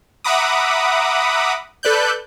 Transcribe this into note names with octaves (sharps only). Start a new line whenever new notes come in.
E5 F#5 A#5 B5 D6 D#6
A4 B4 D5 F#6 G6